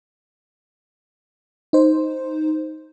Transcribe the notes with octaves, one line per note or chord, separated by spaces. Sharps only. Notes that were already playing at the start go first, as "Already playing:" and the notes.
D#4 C5